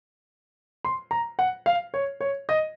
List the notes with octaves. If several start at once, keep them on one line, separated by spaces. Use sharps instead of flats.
C6
A#5
F#5
F5
C#5
C#5
D#5